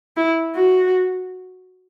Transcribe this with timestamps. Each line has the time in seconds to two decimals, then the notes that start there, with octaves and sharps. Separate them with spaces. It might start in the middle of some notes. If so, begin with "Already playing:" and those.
0.17 E4
0.55 F#4